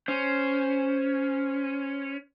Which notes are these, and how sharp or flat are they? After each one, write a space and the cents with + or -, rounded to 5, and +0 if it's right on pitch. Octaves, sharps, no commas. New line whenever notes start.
C#4 +0 C5 +0